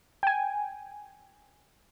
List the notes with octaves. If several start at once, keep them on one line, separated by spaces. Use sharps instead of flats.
G5 G#5